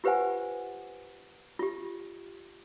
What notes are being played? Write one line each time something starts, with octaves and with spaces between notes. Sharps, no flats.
F4 G4 B4 C5 F#5 G#5
F4 G4